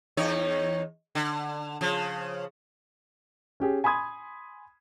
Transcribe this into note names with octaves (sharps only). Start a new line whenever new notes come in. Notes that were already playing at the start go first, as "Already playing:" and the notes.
E2 D#4 C#5
D3
C#3 F3
C#4 G4 G#4
G#5 B5 C6 D#6 G#6